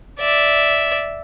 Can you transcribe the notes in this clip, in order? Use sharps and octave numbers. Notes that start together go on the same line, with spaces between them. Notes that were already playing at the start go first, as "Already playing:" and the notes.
D5 E5